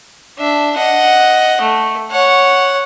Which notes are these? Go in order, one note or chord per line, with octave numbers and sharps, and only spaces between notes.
D4 E5
D#5 F#5
A3
C#5 F#5